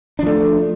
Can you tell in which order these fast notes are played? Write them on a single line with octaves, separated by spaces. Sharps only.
D4 F3 A3